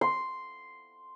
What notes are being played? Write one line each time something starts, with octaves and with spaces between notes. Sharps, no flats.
C6